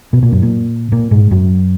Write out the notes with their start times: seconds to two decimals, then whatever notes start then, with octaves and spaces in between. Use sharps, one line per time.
0.13 B2 B3
0.22 A#2 A#3
0.32 F#2 F#3
0.42 A#2 A#3
0.92 A#2 A#3
1.11 G#2 G#3
1.31 F#2 F#3